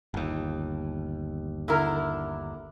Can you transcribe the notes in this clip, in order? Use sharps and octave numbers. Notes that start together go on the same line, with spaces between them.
G1 D#2
D3 E4 A#4